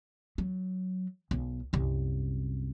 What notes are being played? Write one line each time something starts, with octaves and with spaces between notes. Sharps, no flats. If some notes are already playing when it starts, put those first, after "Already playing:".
F#3
B1
C2 F#2